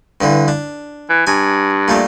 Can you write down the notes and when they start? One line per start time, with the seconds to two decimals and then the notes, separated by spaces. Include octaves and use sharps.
0.21 G2 D3 E3
0.48 D4
1.09 E3
1.27 G2 G#5
1.88 A#2 G3 A3